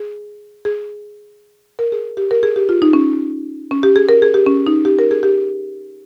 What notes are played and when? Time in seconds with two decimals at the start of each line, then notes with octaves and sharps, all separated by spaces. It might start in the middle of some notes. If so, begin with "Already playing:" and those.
Already playing: G#4
0.65 G#4
1.79 A#4
1.92 G#4
2.17 G4
2.31 A#4
2.43 G#4
2.56 G4
2.69 F4
2.82 D#4
2.93 C#4
3.71 C#4
3.83 G4
3.96 G#4
4.09 A#4
4.22 G#4
4.34 G4
4.46 C#4
4.67 D#4
4.85 G4
4.99 A#4
5.11 G#4
5.23 G4